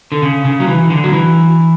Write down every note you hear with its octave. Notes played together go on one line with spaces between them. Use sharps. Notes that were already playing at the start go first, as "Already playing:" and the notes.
D3
C#3
C#3
F#3
E3
D3
F#3
E3